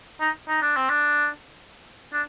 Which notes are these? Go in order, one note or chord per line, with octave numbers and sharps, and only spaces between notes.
D#4
D#4
D4
C4
D4
D4